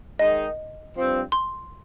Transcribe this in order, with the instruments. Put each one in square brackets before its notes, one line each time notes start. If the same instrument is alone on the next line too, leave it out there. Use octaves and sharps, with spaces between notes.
[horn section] D#3 G#3 D#4 [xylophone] D#5
[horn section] G2 F3 C4
[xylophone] C6